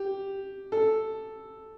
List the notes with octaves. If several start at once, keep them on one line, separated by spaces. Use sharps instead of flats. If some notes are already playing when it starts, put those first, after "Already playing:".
Already playing: G4
A4